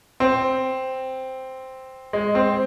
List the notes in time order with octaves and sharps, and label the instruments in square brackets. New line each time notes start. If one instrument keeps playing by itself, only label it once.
[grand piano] C4
G#3
C4